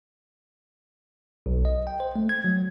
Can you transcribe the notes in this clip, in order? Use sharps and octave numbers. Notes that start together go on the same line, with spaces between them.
B1
D#5
G5
C5
A3
G#6
F#3